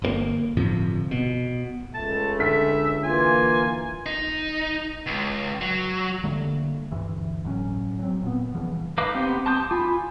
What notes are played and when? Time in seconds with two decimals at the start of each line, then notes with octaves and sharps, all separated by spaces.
0.02 G1 B2 A#3
0.57 G1 A2 C3 F3
1.11 B2
1.94 C#2 A3 A5
2.39 D3 E5 B6
3.04 E3 A#3 F4 G#5
4.06 D#4
5.06 C#2
5.61 F#3
6.24 D3 G3 A3 A#3
6.92 D2 G2 E3
7.44 G1 A2 F#3 C#4
7.99 F#3 C4
8.23 A#2 B3
8.55 C#3 E3 F3 G3
8.98 D#4 B4 F5 D6
9.15 B3 C4 G4
9.46 A5 C6 D6 D#6 G6
9.71 F4 G#5 B5